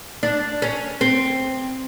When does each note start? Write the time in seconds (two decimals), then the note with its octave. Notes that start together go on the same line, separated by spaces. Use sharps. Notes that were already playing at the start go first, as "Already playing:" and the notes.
0.23 D4
0.62 C#4
1.01 C4